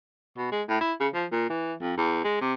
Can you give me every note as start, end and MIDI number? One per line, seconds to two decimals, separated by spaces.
0.37 0.48 47
0.52 0.63 56
0.69 0.79 45
0.81 0.94 64
1.00 1.08 49
1.14 1.26 53
1.32 1.47 46
1.50 1.74 52
1.81 1.97 41
1.97 2.20 40
2.24 2.37 56
2.41 2.54 48